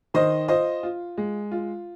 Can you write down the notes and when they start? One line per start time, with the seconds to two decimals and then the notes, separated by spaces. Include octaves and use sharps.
0.14 D#3 C5 D#5
0.48 F4 C5 D#5
0.83 F4
1.18 G#3
1.52 F4